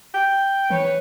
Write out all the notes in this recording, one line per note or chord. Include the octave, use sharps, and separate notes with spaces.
G5
E3 B4 C#5